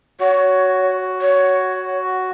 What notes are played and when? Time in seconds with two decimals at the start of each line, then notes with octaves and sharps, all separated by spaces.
0.20 F#4 C#5
1.21 C#5